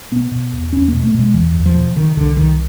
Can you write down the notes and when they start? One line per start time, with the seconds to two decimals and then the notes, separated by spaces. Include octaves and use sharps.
0.11 B2 B3
0.31 B2
0.53 E2
0.73 E2 C#4
0.88 B2 A#3
1.03 A3
1.14 B2
1.20 G#3
1.34 E2 E3
1.55 E2
1.66 F3
1.75 B2
1.96 C3 D#3
2.17 C2 D3
2.36 C2 D#3